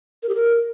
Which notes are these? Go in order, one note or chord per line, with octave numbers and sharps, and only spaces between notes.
A#4
G4
A#4